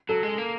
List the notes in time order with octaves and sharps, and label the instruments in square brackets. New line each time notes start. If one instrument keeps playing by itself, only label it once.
[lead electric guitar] F#3 [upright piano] A4
[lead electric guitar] G#3
A#3